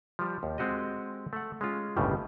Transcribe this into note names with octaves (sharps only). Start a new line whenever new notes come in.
F3 G3
D#2
G#3 C4 F#4 G4 D#5
A3 F#5
G#3 C#4 F4
G1 D#2 A2 C#3 G3